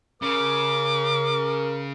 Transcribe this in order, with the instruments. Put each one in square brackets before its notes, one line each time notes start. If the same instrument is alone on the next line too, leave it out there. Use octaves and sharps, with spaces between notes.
[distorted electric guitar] C#3 [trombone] A#4 [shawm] D6